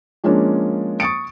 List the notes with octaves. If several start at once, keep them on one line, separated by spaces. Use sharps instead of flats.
F3 G#3 A#3 C#4 D4
C#6 D#6 A6 C#7 D7